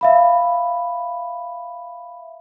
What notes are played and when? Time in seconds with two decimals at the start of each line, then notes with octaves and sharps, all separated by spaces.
0.01 E5 F5 B5